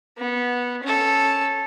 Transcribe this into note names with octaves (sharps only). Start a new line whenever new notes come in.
B3
C#4 A4